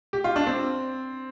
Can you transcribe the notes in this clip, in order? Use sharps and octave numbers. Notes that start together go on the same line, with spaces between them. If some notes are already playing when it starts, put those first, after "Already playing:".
G4
F4
D4
C4